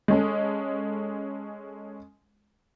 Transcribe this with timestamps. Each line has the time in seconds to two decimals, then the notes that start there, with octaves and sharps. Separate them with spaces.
0.08 G#3 C#4 A4